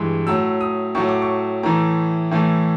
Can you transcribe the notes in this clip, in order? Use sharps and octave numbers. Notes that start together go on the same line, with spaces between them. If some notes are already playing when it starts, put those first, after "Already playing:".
Already playing: G2 E3 G#3
A2 F#3 A3 E6
D#6
A2 F#3 A3 C#6
D6
C#6
A2 E3 A3 A#5
A2 E3 A3